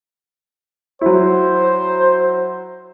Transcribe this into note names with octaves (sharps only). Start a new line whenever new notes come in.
F#3 E4 C5